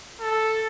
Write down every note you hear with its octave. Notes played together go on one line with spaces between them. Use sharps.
A4